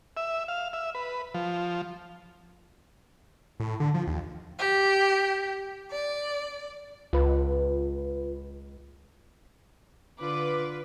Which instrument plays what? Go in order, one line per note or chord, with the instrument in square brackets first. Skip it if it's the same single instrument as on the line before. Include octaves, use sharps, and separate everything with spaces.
[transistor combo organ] E5
F5
E5
B4
F3
[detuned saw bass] A2
D3
F3
D#2
[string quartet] G4
D5
[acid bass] C#2 [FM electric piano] F4 B4
[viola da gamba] D3 [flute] F4 [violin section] B4 [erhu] D6